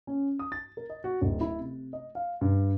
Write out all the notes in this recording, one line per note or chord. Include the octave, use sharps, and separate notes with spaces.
C#4
D#6
A6
A#4
D#5
F#4
D1
E4
C3
D#5
F5
G2